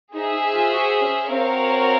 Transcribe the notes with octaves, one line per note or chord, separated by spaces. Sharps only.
D#4 G#4 C5 E5
D#4
F4
F#4
C#4
C4 F#4 A#4 C#5 F5